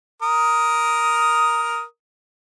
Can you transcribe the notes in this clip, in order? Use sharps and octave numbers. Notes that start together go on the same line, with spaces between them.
A#4 D#6